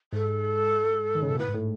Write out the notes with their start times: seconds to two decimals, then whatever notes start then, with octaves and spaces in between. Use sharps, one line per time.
0.13 G#2 A4
1.15 D#3
1.22 C#3
1.30 B2
1.38 A2 B4
1.48 G#2
1.54 A2